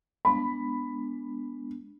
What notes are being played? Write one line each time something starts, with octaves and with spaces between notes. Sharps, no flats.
G#3 B3 D4 B5